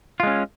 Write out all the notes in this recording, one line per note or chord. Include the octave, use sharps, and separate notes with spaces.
G#3 C#4 F4